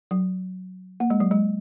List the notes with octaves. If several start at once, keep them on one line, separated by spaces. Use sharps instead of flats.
F#3
A#3
G#3
F#3
G#3